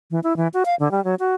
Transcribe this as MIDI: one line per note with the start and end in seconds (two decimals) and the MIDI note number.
0.11 0.20 52
0.24 0.36 64
0.37 0.48 52
0.54 0.63 66
0.65 0.75 77
0.80 0.91 50
0.91 1.03 55
1.04 1.15 54
1.19 1.35 66